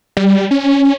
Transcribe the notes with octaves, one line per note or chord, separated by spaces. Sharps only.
G3
C#4